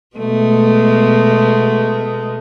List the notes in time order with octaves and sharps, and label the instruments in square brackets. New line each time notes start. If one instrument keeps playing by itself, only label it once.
[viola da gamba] B2 G#3 A3